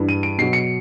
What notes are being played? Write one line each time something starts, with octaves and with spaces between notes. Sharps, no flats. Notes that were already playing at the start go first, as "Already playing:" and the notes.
Already playing: G2 E3 G3
D#7
D7
B2 F#3 C7
C#7